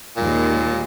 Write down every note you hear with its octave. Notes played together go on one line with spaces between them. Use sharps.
D#2 A#2 G#3